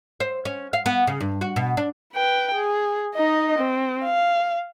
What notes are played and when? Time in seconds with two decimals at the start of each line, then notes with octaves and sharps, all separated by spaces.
0.20 C5
0.45 C#4
0.73 F5
0.86 B3
1.07 C#3
1.20 G2
1.41 F#4
1.56 B2
1.77 D4
2.14 B4 G5
2.55 G#4
3.14 D#4 D#5
3.59 C4
4.04 F5